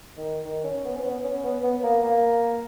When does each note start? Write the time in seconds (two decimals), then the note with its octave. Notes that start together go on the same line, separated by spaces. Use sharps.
0.17 D#3
0.45 D#3
0.64 C#4
0.85 B3
0.96 C#4
1.04 B3
1.24 C#4
1.44 B3
1.63 B3
1.83 A#3
2.04 A#3